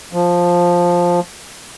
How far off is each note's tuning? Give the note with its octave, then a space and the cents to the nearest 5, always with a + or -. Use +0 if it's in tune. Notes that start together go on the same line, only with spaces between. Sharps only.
F3 +5